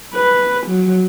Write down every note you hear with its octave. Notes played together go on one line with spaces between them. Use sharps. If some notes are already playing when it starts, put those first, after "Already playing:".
B4
F#3